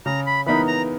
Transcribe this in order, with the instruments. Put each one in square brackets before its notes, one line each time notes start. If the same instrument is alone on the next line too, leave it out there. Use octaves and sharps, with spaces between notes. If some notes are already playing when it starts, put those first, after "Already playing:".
[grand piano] C#3 [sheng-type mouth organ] A#5
[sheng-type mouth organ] B5
[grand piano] E3 B3 D#4 A#4 [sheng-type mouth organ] B5
[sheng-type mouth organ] A#5